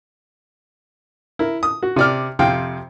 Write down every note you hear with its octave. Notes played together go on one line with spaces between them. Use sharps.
E4 A#4
D#6
F#4
C3 D5 F6
F2 C3 F5 G5